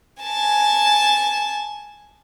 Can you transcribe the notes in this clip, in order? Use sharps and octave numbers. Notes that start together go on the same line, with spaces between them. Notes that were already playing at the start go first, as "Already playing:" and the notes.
G#5 A5